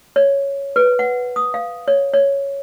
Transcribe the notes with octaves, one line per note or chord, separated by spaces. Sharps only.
C#5
B4
F#5
D#6
F5
C#5
C#5